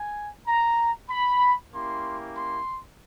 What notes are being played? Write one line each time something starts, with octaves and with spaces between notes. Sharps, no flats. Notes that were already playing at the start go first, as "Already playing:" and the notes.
Already playing: G#5
A#5
B5
A#3 C#4 E4 G4 C6
C6